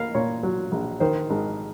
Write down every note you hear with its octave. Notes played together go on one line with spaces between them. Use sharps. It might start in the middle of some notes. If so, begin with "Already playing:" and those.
Already playing: A#3 F5
A#2 C#5
F#3
A#1
D#3 C5
G#1